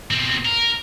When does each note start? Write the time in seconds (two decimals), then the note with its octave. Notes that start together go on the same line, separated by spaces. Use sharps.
0.11 B2 C4
0.45 A#4